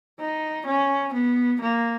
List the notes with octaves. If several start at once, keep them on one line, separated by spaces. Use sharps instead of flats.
D#4
C#4
B3
A#3